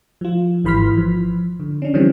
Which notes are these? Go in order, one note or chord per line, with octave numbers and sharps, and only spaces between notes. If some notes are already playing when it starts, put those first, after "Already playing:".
F3 F4
G#1 E3 B5 C6 F6 B6
F3
D3
C#4 D4
D3 E3 F3 G3 C4 C#4